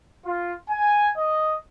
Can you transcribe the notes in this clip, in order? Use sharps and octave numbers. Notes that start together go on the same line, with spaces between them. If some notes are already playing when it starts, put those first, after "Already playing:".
F4
G#5
D#5